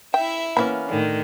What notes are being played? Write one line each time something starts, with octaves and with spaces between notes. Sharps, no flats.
E4 E5 G5
E3 A#3 B3 C#4 B5
A2 D3 D#3